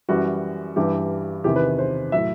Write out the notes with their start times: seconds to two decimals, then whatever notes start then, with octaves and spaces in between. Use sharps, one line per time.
0.09 F#2 E3 G3 F#4
0.76 G2 E3 G3 G4
1.44 E2 C3 D#3 G4
1.56 B4
1.79 C5
2.12 A2 F#3 E5